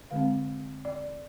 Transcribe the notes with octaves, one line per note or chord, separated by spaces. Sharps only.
D3 G#3 C4 F5
D5